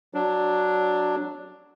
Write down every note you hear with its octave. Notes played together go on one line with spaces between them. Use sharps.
F#3 D4